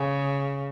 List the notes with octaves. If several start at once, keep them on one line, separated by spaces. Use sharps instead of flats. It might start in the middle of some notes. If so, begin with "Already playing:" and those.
Already playing: C#3